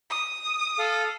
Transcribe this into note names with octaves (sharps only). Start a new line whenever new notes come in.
D#6
A4 F5